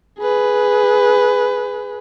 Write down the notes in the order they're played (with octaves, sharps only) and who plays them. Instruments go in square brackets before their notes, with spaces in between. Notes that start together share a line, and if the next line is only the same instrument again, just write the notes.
[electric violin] G#4 B4